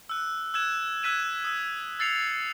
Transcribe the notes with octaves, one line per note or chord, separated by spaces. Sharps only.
E6 F#6
E6 F#6 G#6 E7
E6 F#6 G#6 B6 D#7 E7
D#6 E6
E6 A6 C7 C#7 F7